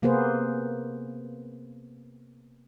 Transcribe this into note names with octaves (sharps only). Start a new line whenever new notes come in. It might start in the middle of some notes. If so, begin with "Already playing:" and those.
C3 A#3 B3 G#4 B4 C5